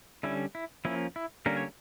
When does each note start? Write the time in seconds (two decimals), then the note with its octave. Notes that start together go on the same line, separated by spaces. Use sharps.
0.23 D3 G3 C#4 E4
0.55 E4
0.85 F3 A#3 C#4 E4
1.16 E4
1.46 D3 G3 A#3 C#4 A#4
1.57 C#5